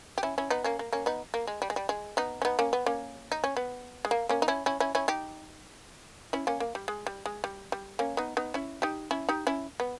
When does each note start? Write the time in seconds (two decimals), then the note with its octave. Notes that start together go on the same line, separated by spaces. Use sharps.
0.18 G4
0.23 C#4 E4
0.38 C#4 E4
0.50 B3 D#4
0.64 A#3 C#4
0.79 A#3
0.93 A#3 C#4
1.06 B3 D#4
1.34 A#3
1.47 G#3
1.62 G3
1.70 G#3
1.76 G3
1.89 G#3
2.17 B3 D#4
2.42 C#4
2.45 B3 D#4
2.59 A#3 C#4
2.73 B3
2.86 A#3 C#4
3.32 D#4
3.44 C#4
3.57 B3
4.05 G#3
4.11 A#3
4.29 A#3 C#4
4.42 D#4
4.48 C#4 E4
4.66 C#4 E4
4.80 C#4 E4
4.95 C#4 E4
5.08 D#4 G4
6.33 C#4 E4
6.47 A#3 C#4
6.60 A#3
6.75 G3
6.88 G#3
7.07 G3
7.26 G#3
7.44 G3
7.72 G3
7.99 A#3 C#4
8.17 B3 D#4
8.37 B3 D#4
8.54 C#4 E4
8.82 D#4 G4
9.11 C#4 E4
9.29 D#4 G4
9.47 C#4 E4
9.80 B3